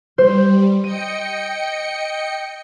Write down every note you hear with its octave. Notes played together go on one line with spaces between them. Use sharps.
G3 C5
D#5 G5 C#7 D#7